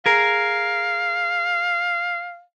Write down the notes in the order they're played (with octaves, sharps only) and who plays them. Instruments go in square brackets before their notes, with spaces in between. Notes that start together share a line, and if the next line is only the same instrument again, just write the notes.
[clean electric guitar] G#4 A#4 [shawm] F5